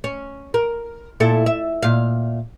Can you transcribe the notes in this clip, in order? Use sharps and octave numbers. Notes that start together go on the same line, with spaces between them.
C#4
A#4
A#2 E4 A4
E5
A#2 F5